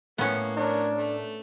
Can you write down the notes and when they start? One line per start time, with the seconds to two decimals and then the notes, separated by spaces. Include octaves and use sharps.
0.18 A2 A#3 B3 C#4
0.57 D4 A#4 C#5
0.96 A3